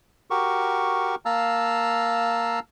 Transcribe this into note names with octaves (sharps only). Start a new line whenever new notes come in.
F#4 G4 A#4 C#6
A#3 F5 A5 A#5 E6